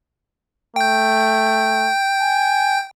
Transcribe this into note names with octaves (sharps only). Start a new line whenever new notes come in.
A3 G5 G6
G#5